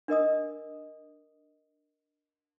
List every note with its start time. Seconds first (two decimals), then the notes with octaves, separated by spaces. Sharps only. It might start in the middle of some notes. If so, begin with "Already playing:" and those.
0.08 D4 A#4 D#5 D#6